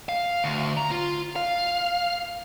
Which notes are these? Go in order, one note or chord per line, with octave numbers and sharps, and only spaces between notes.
F5
D2
A#5
F4
F5